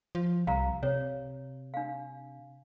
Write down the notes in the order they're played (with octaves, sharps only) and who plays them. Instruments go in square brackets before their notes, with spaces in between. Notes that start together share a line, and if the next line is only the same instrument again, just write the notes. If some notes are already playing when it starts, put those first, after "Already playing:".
[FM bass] F3
[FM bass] C2 [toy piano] F5 A#5
[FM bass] C3 [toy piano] C#5
[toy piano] D4 F5